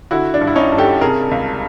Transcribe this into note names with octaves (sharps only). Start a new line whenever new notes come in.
D3 E4 F#4
D4
G2
E4
C#4 D#4
G2
G4 A4
C3 G#4 A#4
C#2